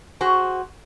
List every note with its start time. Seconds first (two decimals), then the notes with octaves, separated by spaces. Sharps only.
0.21 F#4 G#4 C5